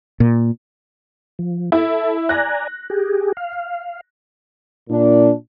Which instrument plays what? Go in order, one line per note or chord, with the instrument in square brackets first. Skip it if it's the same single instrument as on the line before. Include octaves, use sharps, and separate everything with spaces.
[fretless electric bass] A#2
[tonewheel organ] F3
[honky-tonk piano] E4 [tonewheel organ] A4
[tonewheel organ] D5 G#5 A#5 [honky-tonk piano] F#6 A#6
[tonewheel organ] G4 G#4
F5
[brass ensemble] A#2 D4